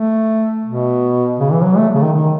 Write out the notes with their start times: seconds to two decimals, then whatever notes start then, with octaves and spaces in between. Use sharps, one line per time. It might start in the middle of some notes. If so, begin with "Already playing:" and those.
Already playing: A3
0.66 B2
1.39 C#3
1.51 E3
1.64 F#3
1.77 A3
1.95 C#3
2.01 D#3
2.13 D#3